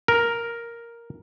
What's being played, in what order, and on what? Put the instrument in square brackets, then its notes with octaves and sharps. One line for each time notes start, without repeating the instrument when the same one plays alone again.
[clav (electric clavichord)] A#4